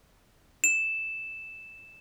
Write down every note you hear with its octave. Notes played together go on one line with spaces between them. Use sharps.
E7